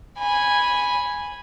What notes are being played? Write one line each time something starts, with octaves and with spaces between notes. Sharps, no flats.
G#5 B5